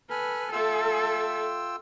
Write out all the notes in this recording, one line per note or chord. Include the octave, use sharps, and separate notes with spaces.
A4 B4 G#5 F6
A3 F4 A4 G5 E6